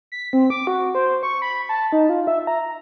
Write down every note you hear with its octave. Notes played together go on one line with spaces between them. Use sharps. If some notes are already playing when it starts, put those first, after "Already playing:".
B6
C4
D6
F#4
C5
C#6
B5
A5
D#4
F4
E5
A#5